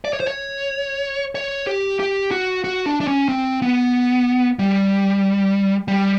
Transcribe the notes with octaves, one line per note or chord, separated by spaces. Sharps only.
D5
C#5
C5
C#5
C#5
G4
G4
F#4
F#4
D4
D4
C#4
C4
B3
G3
G3